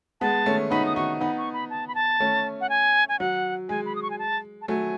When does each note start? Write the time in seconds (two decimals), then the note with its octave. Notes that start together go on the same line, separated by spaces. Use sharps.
0.21 G#3 B3 A5
0.46 A3 C#4
0.70 B3 D#4 B5
0.86 D#6
0.96 D#4 F#4 C#6
1.20 B3 D#4 B5
1.38 C#6
1.53 B5
1.70 A5
1.88 B5
1.95 A5
2.20 A3 C#4
2.61 F#5
2.69 G#5
3.09 G#5
3.19 F#3 F#5
3.69 G#3 G#5
3.86 B5
3.96 D#6
4.02 C#6
4.10 G#5
4.19 A5
4.62 A5
4.68 F#3 A3 G#5